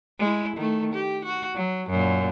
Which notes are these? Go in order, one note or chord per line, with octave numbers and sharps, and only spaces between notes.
G#3 E4
D#3 A3
G4
F#4
F#3
F#2 A#2